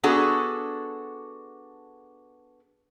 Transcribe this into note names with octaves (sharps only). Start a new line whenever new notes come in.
B3 D4 F#4 G#4 A4